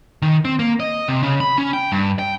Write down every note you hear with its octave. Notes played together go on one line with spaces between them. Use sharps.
D#3
C4
A#3
D#5
C3
C#3
B5
C#4
G5
G2
G5